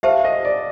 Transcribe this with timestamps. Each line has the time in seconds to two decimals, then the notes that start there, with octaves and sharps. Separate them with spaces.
0.03 G4 C5 E5 F5 A5
0.25 D#5
0.45 D5